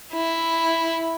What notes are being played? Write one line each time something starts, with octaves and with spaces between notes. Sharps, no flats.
E4